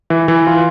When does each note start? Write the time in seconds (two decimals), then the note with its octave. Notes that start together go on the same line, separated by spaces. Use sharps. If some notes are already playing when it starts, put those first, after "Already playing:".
0.10 E3
0.28 E3
0.47 F4